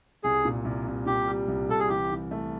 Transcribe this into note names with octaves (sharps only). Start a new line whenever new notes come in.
C2 G#4
A#2
C2
C2
A#2 G4
G3
C2
C2 A4
G#4
E3 G4
E3
A3